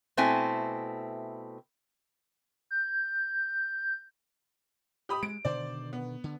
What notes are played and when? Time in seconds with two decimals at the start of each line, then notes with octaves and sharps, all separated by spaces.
0.17 B2 A3 C4 E4 G#5
2.71 G6
5.09 G4 B5 D#6
5.23 G#3 D7
5.45 B2 D3 D#3 C5 D5
5.93 B3
6.24 D3